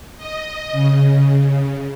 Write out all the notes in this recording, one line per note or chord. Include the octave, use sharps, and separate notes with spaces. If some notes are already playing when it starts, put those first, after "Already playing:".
D#5
C#3